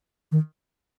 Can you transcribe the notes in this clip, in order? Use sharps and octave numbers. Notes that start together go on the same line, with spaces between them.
D#3